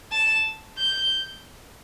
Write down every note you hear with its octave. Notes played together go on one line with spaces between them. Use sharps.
A5
G6